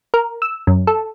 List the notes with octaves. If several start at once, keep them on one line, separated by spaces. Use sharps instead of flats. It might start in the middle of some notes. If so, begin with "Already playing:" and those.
A#4
E6
F#2
A4